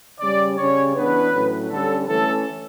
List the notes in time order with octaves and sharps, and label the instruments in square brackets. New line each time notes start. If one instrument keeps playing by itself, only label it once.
[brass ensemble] C#3 G3 C#4 D5
C#3 G3 C#4 C#5
E3 B3 D4 B4
A2 F#3 C#4
D3 G3 C#4 A4
E3 A3 C#4 A4